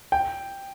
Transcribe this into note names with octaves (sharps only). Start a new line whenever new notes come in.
G5